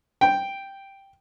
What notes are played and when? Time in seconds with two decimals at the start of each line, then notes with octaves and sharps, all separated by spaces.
0.21 G5